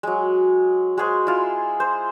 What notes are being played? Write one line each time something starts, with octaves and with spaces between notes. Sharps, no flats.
F#3 G#3
G#3 F#4 G#4 C5
E4 F4
C5